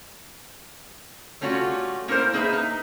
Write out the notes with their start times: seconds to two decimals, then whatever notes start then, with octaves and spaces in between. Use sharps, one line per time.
1.41 G3 A3 C#4 F4 F#4
2.08 A#3 C#4 E4 A#4 C5
2.33 A#3 D#4 G#4 B4 E5
2.53 D#4